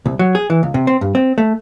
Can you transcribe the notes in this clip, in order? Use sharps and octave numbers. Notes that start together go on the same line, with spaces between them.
C2
F#3
G#4
E3
C#2
C3
C4
G2
C4
A3